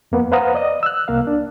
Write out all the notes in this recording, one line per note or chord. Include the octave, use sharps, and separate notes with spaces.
F2 A#3 B3
B4 C5 F5 F#5 A#5 D#6
D5 D#5 D#6
E6 F#6
C2 A#3 F5
D4